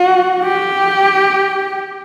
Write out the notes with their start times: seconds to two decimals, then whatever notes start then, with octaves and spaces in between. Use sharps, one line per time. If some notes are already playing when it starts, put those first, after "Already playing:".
Already playing: F#4
0.43 G4